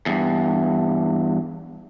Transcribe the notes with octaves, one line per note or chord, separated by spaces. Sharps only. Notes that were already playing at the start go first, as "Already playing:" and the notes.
E2 G2